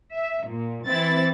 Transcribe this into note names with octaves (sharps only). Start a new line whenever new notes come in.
E5
A#2
E3 C4 E4 A6